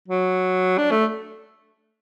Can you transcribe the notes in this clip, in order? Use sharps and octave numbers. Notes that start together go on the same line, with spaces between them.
F#3
D4
A3